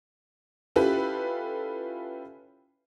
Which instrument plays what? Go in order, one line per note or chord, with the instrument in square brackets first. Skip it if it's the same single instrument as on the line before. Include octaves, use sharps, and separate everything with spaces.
[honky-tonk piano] C#4 E4 F4 G4 A4 B4